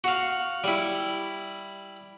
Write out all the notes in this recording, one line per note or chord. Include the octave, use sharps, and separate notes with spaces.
F#4 F5
G3 E4